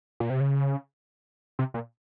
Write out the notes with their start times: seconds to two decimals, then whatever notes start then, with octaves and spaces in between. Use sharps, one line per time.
0.20 A#2
0.30 C3
0.40 C#3
1.59 C3
1.74 A#2